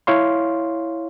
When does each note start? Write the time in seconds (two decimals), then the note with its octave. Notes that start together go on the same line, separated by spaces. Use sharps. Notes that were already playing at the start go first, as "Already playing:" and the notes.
0.07 E4 C#5 F5 C6